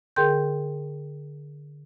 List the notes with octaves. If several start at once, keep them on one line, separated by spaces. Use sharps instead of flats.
D3 G#4 A#4 G5 C6 G6